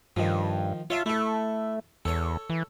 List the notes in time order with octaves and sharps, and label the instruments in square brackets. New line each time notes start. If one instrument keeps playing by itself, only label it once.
[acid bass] G2 [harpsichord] D#3 F3
[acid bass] F4 [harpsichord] C#5 E5 A5
[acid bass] A3 [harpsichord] E4 A4
[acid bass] E2 [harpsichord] A4 C#5
[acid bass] E3